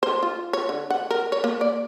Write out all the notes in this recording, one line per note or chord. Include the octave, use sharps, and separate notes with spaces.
C5
F4
C#5
D3
F#5
A#4
C#5
A#3
D5